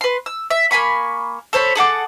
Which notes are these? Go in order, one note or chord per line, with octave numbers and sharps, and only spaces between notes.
B4 C6
E6
E5
A#3 G#5 B5 C#6
A4 C5 C#5 B5
G#4 A4 F#5 D6